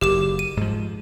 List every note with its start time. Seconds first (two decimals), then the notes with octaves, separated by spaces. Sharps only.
0.01 F#1 G4 D6 E7
0.39 D#7
0.57 G#2 F3